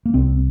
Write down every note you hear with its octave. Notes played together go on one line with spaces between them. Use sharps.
A#3
C2 C3 C4